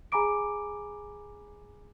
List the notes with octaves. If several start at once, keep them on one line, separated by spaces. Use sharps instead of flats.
G#4 G#5 A#5 B5 D6 D7